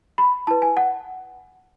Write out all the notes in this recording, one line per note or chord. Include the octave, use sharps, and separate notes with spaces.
B5
E4 B4 A5
G#5
F#5